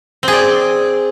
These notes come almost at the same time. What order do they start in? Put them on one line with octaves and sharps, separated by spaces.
C4 G#4 D5